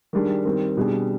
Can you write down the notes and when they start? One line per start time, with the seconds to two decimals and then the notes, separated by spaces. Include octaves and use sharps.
0.13 D#3 G3 D4 G#4
0.45 D#3 G3 C4
0.77 B2 G3 D4 G#4